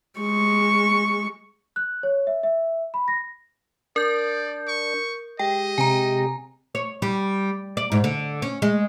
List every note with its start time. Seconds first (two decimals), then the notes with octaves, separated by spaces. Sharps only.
0.20 G#3 C#6
1.76 F#6
2.03 C#5
2.27 E5
2.43 E5
2.94 B5
3.08 A#6
3.96 D4 A#4 D5 G6
4.68 C#6
5.39 G#3 G4 D#5 G5
5.78 C3 G#5 A#5
6.75 C#5
7.02 G3
7.77 D5
7.92 G#2
8.04 D3
8.42 C#4
8.62 G#3